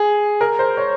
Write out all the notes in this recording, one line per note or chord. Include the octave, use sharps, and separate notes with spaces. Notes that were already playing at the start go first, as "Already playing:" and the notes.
Already playing: G#4
A#4
C5
C#5